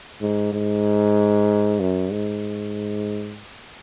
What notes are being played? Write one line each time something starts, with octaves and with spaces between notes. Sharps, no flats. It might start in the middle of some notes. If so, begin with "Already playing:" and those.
G#2
G#2
F#2
G#2